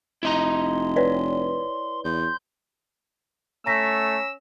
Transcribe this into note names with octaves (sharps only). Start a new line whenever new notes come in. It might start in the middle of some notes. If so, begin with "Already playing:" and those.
F1 E4 D#5 A#5 C6
B4 C#5 D5
E2 C6 G6
A3 C#4 A#5 E6 A#6 B6